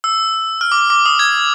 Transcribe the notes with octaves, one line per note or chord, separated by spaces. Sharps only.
E6
F6
D6
D6
D#6
G#6